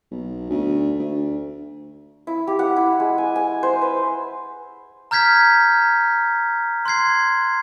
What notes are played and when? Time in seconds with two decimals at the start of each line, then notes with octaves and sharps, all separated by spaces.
0.11 B1
0.50 D2
0.99 D2
2.27 E4
2.47 G4
2.59 F#5
2.76 E4
3.00 G#3
3.18 G#5
3.36 G#5
3.63 C5
3.82 B4
5.11 A#5 F6 G6 G#6 B6
6.85 C6 F#6 G#6 C7